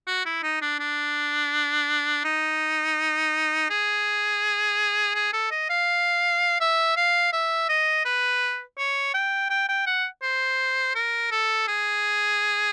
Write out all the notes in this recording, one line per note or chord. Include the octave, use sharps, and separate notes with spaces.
F#4
E4
D#4
D4
D4
D#4
G#4
G#4
A4
D#5
F5
E5
F5
E5
D#5
B4
C#5
G5
G5
G5
F#5
C5
A#4
A4
G#4